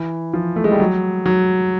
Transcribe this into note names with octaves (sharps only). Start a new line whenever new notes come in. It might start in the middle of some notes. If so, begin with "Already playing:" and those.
Already playing: E3
F3
A3
G#3
G3
F#3
F#3